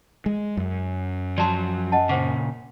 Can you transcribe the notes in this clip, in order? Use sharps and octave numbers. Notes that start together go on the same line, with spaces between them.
G#3
F#2
F3 F#3 D5 A5 C6
D#5 F#5 A5
A#2 C#3 C5 F#5 D6